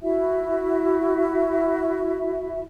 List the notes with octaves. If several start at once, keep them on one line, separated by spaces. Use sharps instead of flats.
E4 F#4 E5